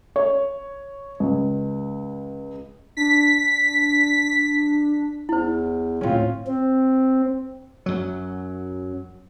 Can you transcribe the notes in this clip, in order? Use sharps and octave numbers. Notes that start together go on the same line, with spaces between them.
C#5
C#2
D4 B6
E2 E4 C5
D2 A2 C4 C#4 F4
C4
F#2 F#3